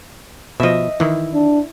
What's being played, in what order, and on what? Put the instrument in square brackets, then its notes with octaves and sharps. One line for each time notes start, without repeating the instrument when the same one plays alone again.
[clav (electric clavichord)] B2 F3 [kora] D#5 E5
[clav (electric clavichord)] D#3 E3 [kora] E4
[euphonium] D4